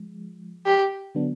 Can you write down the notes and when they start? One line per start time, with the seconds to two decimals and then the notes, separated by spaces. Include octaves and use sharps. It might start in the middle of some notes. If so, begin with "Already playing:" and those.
Already playing: F3 G#3
0.66 G4
1.15 D3 F#3 B3 D4